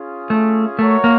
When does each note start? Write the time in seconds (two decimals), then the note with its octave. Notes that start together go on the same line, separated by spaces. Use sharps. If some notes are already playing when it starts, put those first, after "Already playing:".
Already playing: C#4 F4 G#4
0.30 A3
0.79 A3 F#4 A#4 C#5
1.04 A#3